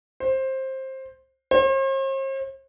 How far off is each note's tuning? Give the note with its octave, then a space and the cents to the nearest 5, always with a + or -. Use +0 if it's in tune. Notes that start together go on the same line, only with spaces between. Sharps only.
C5 +15
C5 +45